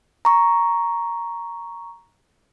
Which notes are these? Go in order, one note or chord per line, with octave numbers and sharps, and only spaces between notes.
A#5 C#6